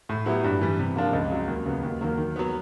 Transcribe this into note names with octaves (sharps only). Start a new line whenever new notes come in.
A2
F#3 B3 E4 G4
G2
E3 G3
C3
F3 A#3 D4 F4
C#2
C#3 F#3
D#2
C#3 F#3 B3
D#2
D#3 F#3 A#3
D#3
F#3 B3